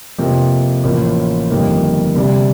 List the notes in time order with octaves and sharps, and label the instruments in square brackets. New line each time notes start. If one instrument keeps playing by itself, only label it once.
[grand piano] F2 C3 F3 A#3
A1 A2 F3 A#3
G1 F2 D#3 G3 A#3
D2 C3 G3 D4